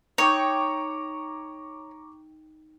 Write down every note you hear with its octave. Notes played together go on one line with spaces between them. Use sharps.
D#4 C#5 G5 A#5 C#6 D6